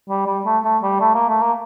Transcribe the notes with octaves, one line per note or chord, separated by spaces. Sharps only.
G3
G3
A3
A3
G3
A3
A#3
A3
A#3